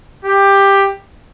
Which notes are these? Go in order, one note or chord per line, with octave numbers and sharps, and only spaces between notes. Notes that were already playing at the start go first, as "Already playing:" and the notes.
G4